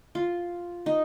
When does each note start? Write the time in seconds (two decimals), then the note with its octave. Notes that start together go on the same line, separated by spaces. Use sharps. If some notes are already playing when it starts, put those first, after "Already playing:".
0.15 F4
0.86 D#4